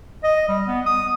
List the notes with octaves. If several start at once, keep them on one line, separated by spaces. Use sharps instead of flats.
D#5
G3
B3
D#6